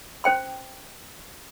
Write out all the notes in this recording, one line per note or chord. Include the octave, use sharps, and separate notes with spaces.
C#4 C5 G5 C6